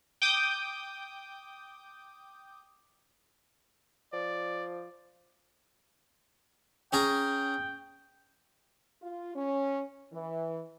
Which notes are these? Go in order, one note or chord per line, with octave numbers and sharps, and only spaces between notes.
G5 D6 D#6 G6
F3 D5
C#4 G#4 G5 A#5
F4
C#4
E3